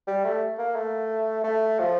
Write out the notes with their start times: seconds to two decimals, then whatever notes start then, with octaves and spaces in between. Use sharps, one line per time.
0.07 G3
0.24 A3
0.59 A#3
0.76 A3
1.44 A3
1.79 F3